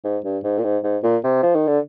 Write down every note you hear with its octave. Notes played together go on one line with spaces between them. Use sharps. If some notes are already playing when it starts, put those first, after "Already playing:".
G#2
G2
G#2
A#2
G#2
G#2
A#2
C3
F3
D#3
D3